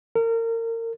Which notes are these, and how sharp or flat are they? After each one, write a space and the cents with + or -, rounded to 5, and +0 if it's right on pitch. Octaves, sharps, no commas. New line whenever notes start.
A#4 -30